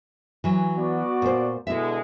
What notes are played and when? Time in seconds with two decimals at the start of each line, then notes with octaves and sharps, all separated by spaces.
0.44 E3 F#3
0.78 B3 F#4 D5
1.22 A#2 C5
1.67 B2 D3 G#3 E4 E5